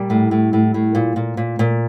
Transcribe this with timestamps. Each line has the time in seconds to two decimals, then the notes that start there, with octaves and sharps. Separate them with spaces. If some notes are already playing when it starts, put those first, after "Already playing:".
Already playing: A#2 G3
0.10 A2
0.31 A2
0.53 A2
0.74 A2
0.95 A#2
1.16 A#2
1.37 A#2
1.59 A#2